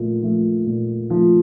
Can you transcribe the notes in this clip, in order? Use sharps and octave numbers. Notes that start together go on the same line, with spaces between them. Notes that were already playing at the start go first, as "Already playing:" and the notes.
Already playing: A#2 F3 A3
F3 A3
A#2
F3 A3